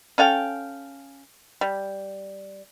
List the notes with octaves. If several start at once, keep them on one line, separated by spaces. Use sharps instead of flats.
C#4 A4 F5 G5
G3